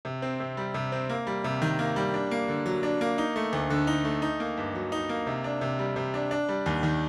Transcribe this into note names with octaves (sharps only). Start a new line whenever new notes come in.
C3
C4
C3
G3
C3
C4
A#3
G3
C3
D#3
A#3
G3
D4
A#3
D3
F#3
D4
A#3
D#4
A3
D2
D3
D#4
A3
D#4
A#3
G2
F#3
D#4
A#3
C3
D4
C3
G3
C3
D4
D4
G3
D#2
D#3